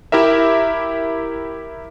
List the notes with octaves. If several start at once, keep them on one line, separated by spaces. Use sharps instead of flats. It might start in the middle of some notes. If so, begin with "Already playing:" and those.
E4 G4 A#4 E5